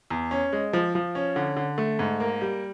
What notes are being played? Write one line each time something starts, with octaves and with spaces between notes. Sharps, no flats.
E2
C#4
G#3
F3
F3
C#4
D3
D3
A3
G#2
A#3
G3